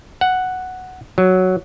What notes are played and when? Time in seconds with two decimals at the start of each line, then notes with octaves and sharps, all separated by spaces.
0.21 F#5
1.18 F#3